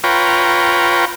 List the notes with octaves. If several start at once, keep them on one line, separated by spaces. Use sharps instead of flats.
F4 B4 C#5 G5 A#5